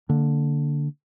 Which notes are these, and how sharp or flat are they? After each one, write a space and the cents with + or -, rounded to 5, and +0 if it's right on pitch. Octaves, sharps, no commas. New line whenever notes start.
D3 +0 A#3 -15